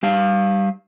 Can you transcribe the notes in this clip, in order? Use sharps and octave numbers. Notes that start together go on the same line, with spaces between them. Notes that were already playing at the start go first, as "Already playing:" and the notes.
G3 G4 F5